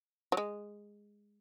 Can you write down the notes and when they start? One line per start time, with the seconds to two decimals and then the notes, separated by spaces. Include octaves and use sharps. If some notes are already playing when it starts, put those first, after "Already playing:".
0.32 F#3
0.37 G#3